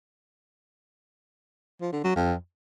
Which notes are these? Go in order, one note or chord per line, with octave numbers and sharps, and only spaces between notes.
F3
D3
F#3
F2